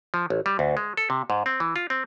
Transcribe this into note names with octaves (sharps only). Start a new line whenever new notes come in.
F3
A1
G3
D2
G#3
A4
C3
G#2
C4
E3
F4
C4